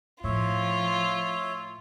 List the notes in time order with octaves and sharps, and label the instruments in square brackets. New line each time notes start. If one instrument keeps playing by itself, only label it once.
[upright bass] A2 [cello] F3 [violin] F4 [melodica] C#5 E5